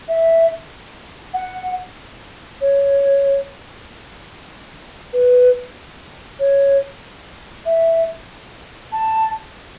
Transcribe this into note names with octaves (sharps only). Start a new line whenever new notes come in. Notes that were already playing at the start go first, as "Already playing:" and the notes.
E5
F#5
C#5
B4
C#5
E5
A5